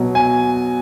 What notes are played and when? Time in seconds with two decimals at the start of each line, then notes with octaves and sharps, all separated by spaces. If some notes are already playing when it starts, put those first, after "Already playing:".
Already playing: B2 F#3
0.15 G#5